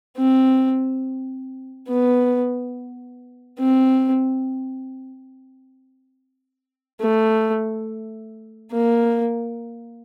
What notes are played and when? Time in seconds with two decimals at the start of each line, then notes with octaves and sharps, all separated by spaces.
0.17 C4
1.88 B3
3.59 C4
7.01 A3
8.72 A#3